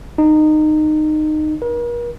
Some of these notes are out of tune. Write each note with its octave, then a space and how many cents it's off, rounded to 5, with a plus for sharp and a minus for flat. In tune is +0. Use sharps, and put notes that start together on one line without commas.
D#4 -20
A#4 +45